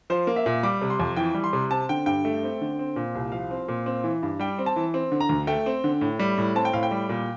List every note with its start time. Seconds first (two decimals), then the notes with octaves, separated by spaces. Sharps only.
0.10 F3 C5
0.27 A#3
0.36 E5
0.46 A#2
0.63 G3 D6
0.82 C3
0.90 C6
0.99 F2
1.16 E3 G5
1.34 G3
1.44 C6
1.53 C3
1.71 C4 A5
1.89 D3 G5
2.06 G2 G5
2.25 A3
2.43 C4
2.61 D3
2.79 C4
2.96 A#2
3.15 C2
3.32 F3 F5
3.51 C4
3.68 A#2
3.86 C4
4.04 E3
4.23 G2
4.39 G3 G5
4.59 C4
4.66 A5
4.76 E3
4.94 C4
5.12 D3
5.21 A#5
5.29 D2
5.47 A3 G5
5.66 C4
5.84 D3
6.01 A2
6.19 G3
6.38 A2
6.55 C4 A5
6.65 G5
6.73 A2 F5
6.83 G5
6.91 G3
7.09 A#2